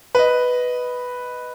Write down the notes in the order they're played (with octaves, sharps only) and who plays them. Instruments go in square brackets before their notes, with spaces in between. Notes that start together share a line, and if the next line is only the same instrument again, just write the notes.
[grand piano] B4 D#5